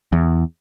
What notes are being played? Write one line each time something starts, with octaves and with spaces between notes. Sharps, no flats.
E2